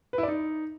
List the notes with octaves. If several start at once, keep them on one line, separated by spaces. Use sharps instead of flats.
B4
E4
D5
D#4